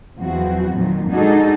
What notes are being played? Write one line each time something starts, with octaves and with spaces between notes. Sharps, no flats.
E2 F3 F#3 C4 F#4
F2 A#2 D#3 F3 F#3
G#3 D4 D#4 F#4 G#4 A4